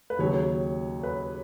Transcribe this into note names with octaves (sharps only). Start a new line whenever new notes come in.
B4
D#2 C#3 F#3 C#5
C#5
B4